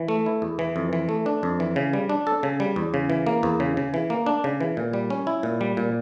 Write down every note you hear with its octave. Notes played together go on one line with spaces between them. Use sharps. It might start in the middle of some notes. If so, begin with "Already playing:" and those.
Already playing: E3
A3
E4
E2
E3
F2
E3
A3
D4
F2
E3
C#3
G3
D4
A4
C#3
G3
E2
C#3
E3
A#3
E2
C#3
C#3
E3
A#3
D4
C#3
E3
A#2
G3
C#4
E4
A#2
G3
A#2